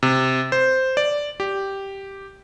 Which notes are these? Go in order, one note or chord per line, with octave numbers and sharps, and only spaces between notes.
C3
C5
D5
G4